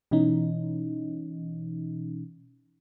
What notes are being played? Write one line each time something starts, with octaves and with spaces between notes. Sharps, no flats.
B2 E3 C#4 D#4